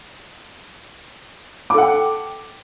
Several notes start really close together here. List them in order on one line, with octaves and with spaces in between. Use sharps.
D6 A4 F#5 G5